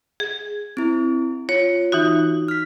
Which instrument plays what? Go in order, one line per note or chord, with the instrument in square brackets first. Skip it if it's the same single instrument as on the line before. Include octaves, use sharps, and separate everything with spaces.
[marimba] G#4
[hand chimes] C4 E4
[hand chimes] F4 [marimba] C#5
[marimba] E3 D#4 F#4
[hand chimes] F6 B6